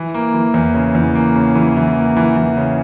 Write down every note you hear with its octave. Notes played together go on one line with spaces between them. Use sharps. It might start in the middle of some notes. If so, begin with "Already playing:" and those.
Already playing: E3
A#3
E3
E2
C#3
E2
A#3
C#3
E3
E3
A#3
E3
E3
C#3